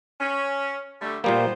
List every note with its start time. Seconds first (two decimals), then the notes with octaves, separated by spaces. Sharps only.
0.20 C#4
1.01 D3 G3 A3
1.24 A#2 G3 A#3 B3 A#4 C5